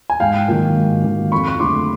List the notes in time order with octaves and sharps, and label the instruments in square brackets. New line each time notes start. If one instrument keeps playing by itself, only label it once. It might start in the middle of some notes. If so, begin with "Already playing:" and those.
[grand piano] G#5
[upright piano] G#2 [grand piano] F5 G5
[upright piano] D#3 F#3 A#3
G#2
D#3 F#3 A#3
[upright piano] F2 [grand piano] B5 C#6
[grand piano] C#6
[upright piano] D3 F#3 A3 [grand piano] C6 D6